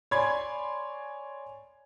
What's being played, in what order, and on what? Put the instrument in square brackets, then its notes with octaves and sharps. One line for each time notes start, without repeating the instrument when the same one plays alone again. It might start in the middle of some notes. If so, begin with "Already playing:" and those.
[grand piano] C#5 D5 G#5 B5 C6 G#6